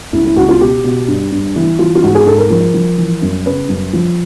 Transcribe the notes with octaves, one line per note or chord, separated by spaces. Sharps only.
C#2 E4
E4
C#2 F#4
F4
B2 G4
B2
G2
G2
E3 E4
E3 F4
F4
G#2 F#4
G#4
G#2 A4
A#4
F3 A#4
F3
E3
F#2
C#3 B4
F#2
F3